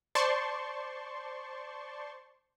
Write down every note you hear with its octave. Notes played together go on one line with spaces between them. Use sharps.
C5 D5 A5 C6 C#6